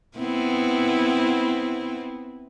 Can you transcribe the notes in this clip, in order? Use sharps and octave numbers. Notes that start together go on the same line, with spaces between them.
B3 C4 E4